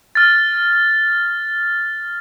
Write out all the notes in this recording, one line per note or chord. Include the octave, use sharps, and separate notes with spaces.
F6 A6